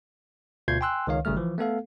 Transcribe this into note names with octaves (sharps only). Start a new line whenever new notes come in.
D2 B2 F4 G6 G#6 C7
G5 G#5 C6 E6 F#6
C#2 D#3 C#5 F5
G#1 C#3 G3 A3 F6
E3 F3
A3 B3 A4 F5